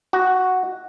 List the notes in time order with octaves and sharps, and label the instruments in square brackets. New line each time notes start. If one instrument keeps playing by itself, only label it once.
[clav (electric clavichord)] F#4